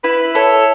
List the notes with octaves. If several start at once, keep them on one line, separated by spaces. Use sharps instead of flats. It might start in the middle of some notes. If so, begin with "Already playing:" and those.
E4 B4
A4 C#5